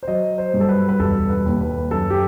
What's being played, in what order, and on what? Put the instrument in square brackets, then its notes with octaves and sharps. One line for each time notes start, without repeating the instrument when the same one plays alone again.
[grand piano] C5
F#3 D#5
C5
G2
A4
B4
B4
E1 A4
B4
D#2
B4
F#2 A4
G4